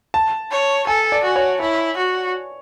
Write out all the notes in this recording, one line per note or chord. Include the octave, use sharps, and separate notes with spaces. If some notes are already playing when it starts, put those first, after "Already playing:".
A5
C#5
A4 G#5
D5
F#4
C#5
E4 C#5
F#4